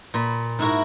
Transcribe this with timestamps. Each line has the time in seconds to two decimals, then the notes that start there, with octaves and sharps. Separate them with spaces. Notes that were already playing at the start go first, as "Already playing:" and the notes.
0.14 A#2 B5
0.59 G#2 E4 F#4 A#4